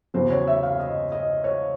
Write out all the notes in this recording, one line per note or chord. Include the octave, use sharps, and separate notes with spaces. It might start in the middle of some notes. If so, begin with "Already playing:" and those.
E2 C#3 F#3 C5
C#5
E5
F5
D#5
D#5
C#5